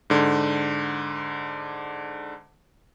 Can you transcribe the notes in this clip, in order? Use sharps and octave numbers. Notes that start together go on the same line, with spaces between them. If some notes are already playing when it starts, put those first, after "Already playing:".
G#2 D3